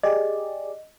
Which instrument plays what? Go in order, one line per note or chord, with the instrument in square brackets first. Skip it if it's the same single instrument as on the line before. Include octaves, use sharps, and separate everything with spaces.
[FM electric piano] G4 G#4 D5 [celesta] D#5